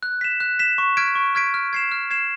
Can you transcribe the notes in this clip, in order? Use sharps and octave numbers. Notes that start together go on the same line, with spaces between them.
F#6
B6 E7
F#6
B6 E7
C#6
F6 G#6 B6 D7
C#6
F6 G#6 B6 D7
F6
G#6 C7 E7
F6
G#6 C7 E7